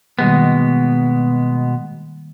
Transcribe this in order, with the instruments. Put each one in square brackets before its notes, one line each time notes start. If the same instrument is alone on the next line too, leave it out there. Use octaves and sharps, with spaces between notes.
[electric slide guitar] B2 G#3 B3 [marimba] D#3 G3 A#3